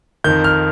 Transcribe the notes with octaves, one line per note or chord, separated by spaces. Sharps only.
F2 D#3 G6
F6